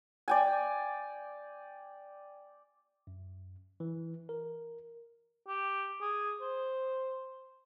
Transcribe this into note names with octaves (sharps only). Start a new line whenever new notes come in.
D5 G5 G#5
F#2
E3
A#4
G4
G#4
C5